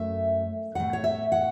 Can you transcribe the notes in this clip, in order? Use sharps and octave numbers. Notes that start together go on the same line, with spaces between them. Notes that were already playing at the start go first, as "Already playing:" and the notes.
Already playing: F#2 A3 E5
A2 A3 F#5
C#5
E5
F#5